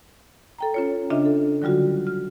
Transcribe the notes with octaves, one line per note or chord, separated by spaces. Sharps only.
A4 G5 A#5
C#4 F4 C#5
C#3 D4 F4 D#5 E5
A4
D3 F#3 G3 F4 F#4
F6